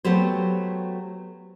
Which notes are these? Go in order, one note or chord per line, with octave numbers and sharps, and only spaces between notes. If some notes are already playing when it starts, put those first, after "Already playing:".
F#3 A3 B3 G4 C5